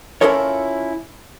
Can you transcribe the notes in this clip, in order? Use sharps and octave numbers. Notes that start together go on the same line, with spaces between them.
C#4 E4 F4 A4 A#4 C#5